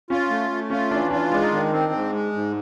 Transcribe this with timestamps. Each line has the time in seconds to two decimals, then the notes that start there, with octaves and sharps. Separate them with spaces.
0.10 C#4 F4
0.30 A3
0.51 A3
0.70 C#4 F4
0.91 E3 D4
1.11 D4 F4
1.32 G#3 D4
1.43 D#4
1.52 D#3 D4
1.72 C4
1.92 G#2
2.12 G#3
2.32 G#2